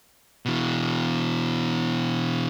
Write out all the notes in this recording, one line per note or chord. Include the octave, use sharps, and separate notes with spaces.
B2 E3